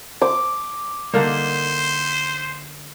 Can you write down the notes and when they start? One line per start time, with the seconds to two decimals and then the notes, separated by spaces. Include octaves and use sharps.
0.22 C5 D6
1.14 D3 G3 A#3 D#4 C5